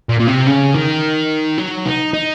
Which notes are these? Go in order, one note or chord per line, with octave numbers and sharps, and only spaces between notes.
A#2
A#2
C3
C#3
D#3
F#3
D#4
D#4